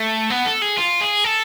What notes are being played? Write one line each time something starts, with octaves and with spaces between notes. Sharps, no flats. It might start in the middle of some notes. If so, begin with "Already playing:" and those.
Already playing: A3
B3
A4
G#4
F4
G#4
A4